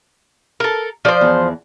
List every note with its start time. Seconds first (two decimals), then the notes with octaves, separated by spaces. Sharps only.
0.60 A4 A#4
1.05 F3 C5 D5
1.21 E2 G#4